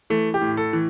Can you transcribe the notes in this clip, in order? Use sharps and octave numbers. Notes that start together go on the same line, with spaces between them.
E3 A3
G4
A2
A4
E3